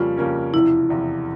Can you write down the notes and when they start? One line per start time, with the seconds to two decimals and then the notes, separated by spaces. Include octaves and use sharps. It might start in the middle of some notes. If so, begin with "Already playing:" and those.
Already playing: F2 C#3 G3 A#3 C#4 F4
0.17 F2 C#3 G3 A#3 C#4
0.53 E2 C3 F3 E4
0.90 E2 C3 F3